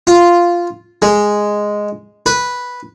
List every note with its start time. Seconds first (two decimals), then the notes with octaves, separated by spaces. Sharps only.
0.07 F4
1.02 G#3
2.26 B4